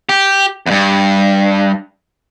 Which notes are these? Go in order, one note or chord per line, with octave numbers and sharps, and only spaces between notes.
G4
E2 G2